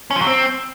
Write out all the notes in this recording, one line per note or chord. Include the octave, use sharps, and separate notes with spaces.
C#4
F3
F#3
C4